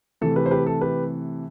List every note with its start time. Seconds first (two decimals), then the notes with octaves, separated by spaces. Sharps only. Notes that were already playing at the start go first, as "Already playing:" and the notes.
0.21 C3 E3 A3 A4
0.36 G4 B4
0.46 C5
0.51 G4 B4
0.66 A4
0.81 G4 B4